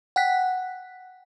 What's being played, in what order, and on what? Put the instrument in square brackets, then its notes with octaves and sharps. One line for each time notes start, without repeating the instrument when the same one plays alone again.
[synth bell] F#5 G5 F#6 B6